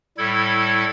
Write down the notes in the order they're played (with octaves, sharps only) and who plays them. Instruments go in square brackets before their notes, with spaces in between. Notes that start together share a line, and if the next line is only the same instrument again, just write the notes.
[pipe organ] A2 G3 E4 A4 G#6